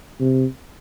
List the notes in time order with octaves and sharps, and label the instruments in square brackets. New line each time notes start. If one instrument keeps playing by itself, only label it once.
[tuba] C3